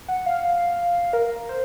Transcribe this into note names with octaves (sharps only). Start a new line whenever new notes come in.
F#5
F5
A#4
C5